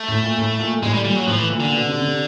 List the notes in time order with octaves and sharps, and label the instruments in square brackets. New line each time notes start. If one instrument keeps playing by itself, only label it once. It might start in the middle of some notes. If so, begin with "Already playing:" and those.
Already playing: [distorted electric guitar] A3
[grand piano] A2
A#2
A2
A#2
[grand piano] A2 [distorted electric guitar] G#3
[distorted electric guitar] G3
[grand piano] A#2 [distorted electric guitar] G3
[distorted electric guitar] F#3
[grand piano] A2 [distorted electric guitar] F3
[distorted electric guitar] E3
[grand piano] A#2
[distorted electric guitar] D3
[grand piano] B2
C3
C3